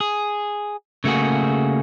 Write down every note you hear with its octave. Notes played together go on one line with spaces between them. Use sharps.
G#4
C#3 A3 A#3 F#4 G#4